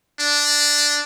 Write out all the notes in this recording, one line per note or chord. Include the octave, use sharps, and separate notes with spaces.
D4